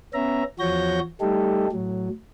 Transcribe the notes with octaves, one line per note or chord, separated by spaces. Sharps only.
B3 C#4 E5 A#5
E2 F3 F#4 C#5 G6 A#6
G3 A3 D#4 G4 A4
A2 F#3